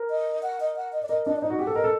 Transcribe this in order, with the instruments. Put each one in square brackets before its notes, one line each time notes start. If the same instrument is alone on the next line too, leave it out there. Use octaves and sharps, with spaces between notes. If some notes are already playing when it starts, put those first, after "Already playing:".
Already playing: [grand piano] A#4
[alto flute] D#5
F#5
D#5
F#5
D#5
D5
[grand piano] A#4 [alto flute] D#5
[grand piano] D4 [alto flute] D#5
[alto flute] D5
[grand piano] D#4 [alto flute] D#5
[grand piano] F#4
[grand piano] G4 [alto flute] F#5
[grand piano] A4
[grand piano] A#4 [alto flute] D#5
[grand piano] A4